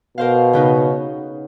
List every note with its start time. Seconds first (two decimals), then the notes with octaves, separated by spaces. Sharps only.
0.18 B2 A#4 C5 F5
0.53 C#3 B3 D#4